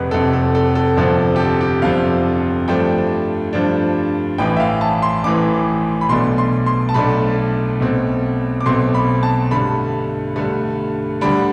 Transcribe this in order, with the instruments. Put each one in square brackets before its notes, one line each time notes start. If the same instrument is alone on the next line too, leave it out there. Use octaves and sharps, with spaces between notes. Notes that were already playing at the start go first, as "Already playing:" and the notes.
Already playing: [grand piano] F1 F2 C3 B4
F1 F2 C3 A4
A4
A4
A4
G1 F2 C3 F3 A4
G4
A4
G4
G1 F2 C3 F3 F5
G2 F3 A3 D4 G5
G2 F3 A3 D4
A1 A2 E3 G5
E5
F5
A5
C6
A1 A2 E3 D6
B5
B1 B2 A3 D4 C6
C6
C6
A5
B1 B2 A3 D4 B5
B1 B2 A3 C4
D6
B1 B2 A3 C4 C6
B5
A5
G2 D3 A3 B5
G2 D3 A3
D2 D3 G3 D4 B5